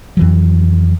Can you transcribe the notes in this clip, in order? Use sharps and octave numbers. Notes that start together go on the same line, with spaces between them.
F2 E3 F#3